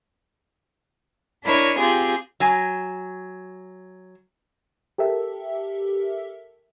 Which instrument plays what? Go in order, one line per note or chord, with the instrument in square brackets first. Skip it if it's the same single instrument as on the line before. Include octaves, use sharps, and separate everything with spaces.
[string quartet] D4 E4 A#4 C#5 D#5
C4 F4 G4 G#4
[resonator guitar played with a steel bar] F#3 G#5
[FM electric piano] G4 A4 A#4 E5